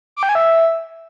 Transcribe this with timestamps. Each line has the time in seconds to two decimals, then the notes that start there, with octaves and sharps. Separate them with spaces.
0.16 D6
0.23 G5
0.29 G#5
0.35 E5